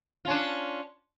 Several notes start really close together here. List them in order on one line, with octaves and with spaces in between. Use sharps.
F4 C#4 D4